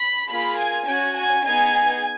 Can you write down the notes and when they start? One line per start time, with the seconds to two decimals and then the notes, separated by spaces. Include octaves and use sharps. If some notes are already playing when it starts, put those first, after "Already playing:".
Already playing: B5
0.29 A#3 F4 G#4 B5
0.58 G#5
0.87 C#4 F#4 G#5
1.16 G#5
1.45 B3 D#4 G#4 G#5